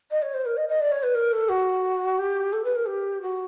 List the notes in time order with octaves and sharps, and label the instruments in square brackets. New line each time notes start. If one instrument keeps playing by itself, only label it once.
[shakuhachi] D#5
C#5
C5
A#4
D#5
D#5
D5
C#5
B4
A#4
A4
F#4
G4
A4
B4
A#4
G4
F#4